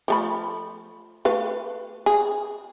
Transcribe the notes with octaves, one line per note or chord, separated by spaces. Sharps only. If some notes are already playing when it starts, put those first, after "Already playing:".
F3 A3 B5
A3 B4 F5
G#4